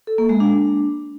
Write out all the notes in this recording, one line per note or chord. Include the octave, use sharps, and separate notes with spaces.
A4
A#3
G#3
D4